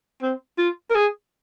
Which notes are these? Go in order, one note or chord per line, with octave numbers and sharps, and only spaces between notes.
C4
F4
A#4
G#4